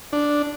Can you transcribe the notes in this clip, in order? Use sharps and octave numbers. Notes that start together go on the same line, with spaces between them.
D4